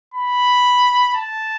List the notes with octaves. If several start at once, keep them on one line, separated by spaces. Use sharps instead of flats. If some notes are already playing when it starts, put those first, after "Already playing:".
B5
A5